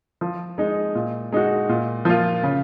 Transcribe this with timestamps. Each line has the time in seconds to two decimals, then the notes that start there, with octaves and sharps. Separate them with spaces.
0.21 F3
0.58 G#3 D#4
0.95 A#2
1.32 G#3 D#4 F#4
1.69 A#2
2.05 F3 A#3 F4
2.43 C#3